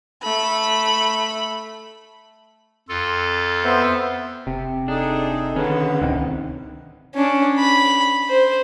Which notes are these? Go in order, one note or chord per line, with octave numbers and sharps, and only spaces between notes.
A3 B5
F2 F4 A4
B3 C5 E5
F1 C3
D4 D#4 G#4 A4
D3 D#3 B3 C#4 B4
D1 C#2 C3 D#3
C#4 D4
B5
C5